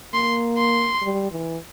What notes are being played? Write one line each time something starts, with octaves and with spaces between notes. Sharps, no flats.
A#3 C6
C6
G3
E3